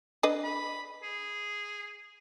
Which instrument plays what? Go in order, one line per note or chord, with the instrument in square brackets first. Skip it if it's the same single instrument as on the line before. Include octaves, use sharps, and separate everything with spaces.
[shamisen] D4 B4 D#5
[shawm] B5
G#4